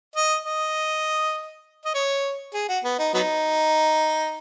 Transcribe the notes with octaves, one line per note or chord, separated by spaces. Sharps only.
D#5
D#5
D#5
C#5
G#4
F#4
B3
D#4
F#3 B3 D#4